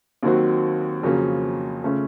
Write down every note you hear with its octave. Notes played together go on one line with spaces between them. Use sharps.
D#2 D#3 F#3 C4 F#4
F2 C#3 F#3 A#3 C#4
C#3 A3 C#4 F4